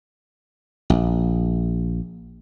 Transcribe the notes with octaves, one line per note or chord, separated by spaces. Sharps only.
A#1